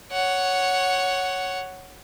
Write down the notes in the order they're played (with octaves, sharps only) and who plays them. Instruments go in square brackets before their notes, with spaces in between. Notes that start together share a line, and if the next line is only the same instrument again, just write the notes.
[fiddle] C#5 F#5